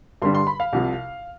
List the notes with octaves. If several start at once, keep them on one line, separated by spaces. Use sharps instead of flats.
G2 D3 G3 D4 C6
C6
B5
F5
C2 C3 F3